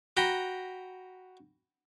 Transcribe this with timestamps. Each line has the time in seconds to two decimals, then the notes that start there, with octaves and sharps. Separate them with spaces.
0.17 F#4 G5 A#5 B5